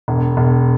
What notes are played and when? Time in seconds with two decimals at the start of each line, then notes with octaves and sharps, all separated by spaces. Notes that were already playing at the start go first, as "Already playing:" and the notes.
0.08 E1
0.37 E1